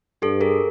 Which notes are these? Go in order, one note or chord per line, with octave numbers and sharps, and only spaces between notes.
G2 G4 A4
G#4 A#4